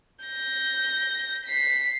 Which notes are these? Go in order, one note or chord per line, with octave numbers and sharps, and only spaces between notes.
G6 A#6
B6 C7